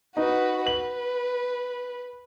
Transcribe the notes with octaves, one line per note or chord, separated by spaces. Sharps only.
D#4 F#4 B4
B4 F#7